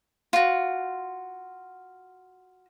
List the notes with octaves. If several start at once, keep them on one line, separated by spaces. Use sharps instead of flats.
F4 F#4